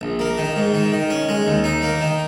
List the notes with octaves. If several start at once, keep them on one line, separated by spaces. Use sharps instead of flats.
A#1
A#3
D#3
G#2
D#3
D#3
C#4
G#3
D#2
D#4
A#3
D#3